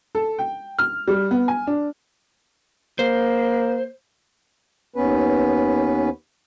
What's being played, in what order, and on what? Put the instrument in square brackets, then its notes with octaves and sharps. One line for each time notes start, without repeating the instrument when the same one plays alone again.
[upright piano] A4
G5
F6
G3
B3
G#5
D4
[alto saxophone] A#3 [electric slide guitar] C5
[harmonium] D#2 B3 C#4 B4